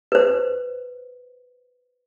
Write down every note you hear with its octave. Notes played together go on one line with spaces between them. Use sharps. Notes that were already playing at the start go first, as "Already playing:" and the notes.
B4 C5